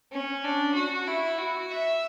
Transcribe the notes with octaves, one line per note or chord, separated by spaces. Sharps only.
C#4
D4
F#4
E4
F#4
E5